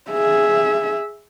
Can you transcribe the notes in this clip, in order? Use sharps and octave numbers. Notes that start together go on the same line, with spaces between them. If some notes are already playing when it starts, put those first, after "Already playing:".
G#4 E5